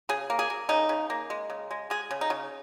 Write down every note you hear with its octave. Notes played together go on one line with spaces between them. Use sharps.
C#3 G#4
A#3
G#4
A#3
C#3 D#4
C#3
A#3
G#3
C#3
G#3
G#3 G#4
C#3
D#4
C#3